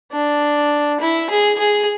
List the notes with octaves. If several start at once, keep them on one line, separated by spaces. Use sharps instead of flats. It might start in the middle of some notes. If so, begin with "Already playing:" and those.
D4
E4
G#4
G#4